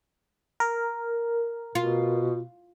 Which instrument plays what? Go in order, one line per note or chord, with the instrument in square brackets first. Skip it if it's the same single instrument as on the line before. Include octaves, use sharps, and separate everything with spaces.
[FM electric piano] A#4
[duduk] B2 [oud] F4